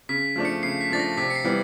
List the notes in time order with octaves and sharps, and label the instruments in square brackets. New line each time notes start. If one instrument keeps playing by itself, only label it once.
[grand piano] C#3 [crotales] B6
[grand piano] F3 A3 D4
[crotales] C#7
[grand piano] C#3 [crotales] C7
[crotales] B6
[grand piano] F3 A3 D4 [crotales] A6
[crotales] A#6
[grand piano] C3 [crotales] B6
[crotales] C#7
C7
[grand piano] E3 G3 B3